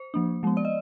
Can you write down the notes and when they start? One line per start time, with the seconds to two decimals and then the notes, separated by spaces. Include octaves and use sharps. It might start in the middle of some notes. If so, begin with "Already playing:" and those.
Already playing: C5
0.14 F3 A#3 D4
0.43 F3 G#3 B3
0.57 D5
0.65 D#5